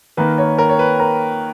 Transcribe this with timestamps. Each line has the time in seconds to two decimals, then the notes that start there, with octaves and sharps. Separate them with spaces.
0.17 D#3 A#3 D#4 B4
0.38 C#5
0.58 A#4
0.69 C#5
0.79 B4
1.00 A#4